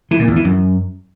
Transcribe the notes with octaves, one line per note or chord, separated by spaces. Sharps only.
E3
A#2
E2
E3
F#2